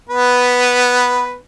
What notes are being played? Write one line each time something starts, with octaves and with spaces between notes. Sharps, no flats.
B3 B4